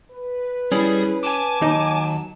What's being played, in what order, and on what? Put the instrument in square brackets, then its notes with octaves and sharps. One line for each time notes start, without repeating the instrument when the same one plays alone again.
[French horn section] B4
[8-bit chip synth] G3 G#4 [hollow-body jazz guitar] C#4 [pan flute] E4
[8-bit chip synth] G#5 D6 [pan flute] A5
[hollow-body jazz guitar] D#2 D#4 [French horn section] F#3